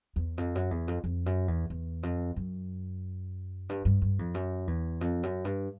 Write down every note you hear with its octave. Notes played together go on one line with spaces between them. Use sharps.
E2
F2
F#2
E2
F2
F2
F#2
E2
E2
F2
F#2
G2
G2
G2
F2
F#2
E2
F2
F#2
G2